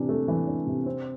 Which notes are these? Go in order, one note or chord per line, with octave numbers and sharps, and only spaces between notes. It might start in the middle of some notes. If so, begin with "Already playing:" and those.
Already playing: C3 E3 D4
A3
E3
D4
C3
C4